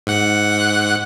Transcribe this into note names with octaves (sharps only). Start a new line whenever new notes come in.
G#2 F#5 F#6